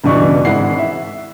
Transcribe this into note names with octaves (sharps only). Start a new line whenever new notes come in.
C#2 G2 B2 E3 D5 C#6
G#1 G#2 E4 F#5 C7
E5